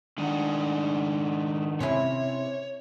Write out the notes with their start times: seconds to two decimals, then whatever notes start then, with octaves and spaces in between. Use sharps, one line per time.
0.18 D#3 G#3 D4 D#4 F#5
1.80 C3 C#4 E4 C#5